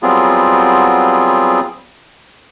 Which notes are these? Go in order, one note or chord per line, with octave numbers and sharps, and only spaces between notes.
F#3 G3 B3 C4 F4 G#4